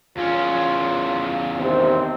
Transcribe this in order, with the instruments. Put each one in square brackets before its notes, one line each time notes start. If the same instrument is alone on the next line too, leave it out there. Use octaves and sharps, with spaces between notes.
[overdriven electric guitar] E2 C#4 [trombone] F4
[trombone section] C3 D#3 C4